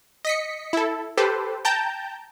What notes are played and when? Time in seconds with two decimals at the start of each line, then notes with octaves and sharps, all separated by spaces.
0.25 D#5 B6 C#7
0.73 E4 A4
1.17 G4 A4 B4 C5
1.65 G5 A5 A#5 G6